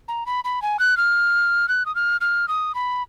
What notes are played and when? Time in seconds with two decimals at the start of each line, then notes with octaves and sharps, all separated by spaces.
0.08 A#5
0.26 B5
0.44 B5
0.62 G#5
0.79 F#6
0.97 F6
1.68 F#6
1.86 D#6
1.95 F6
2.21 F6
2.48 D#6
2.75 B5